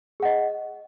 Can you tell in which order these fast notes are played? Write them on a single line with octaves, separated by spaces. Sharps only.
G#4 F#5 D#5